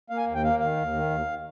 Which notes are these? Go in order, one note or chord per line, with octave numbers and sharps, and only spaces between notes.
A#3 F5
G#5
D#2
G5
A#3 F5
D#3 F5
D#2
D#3
D#2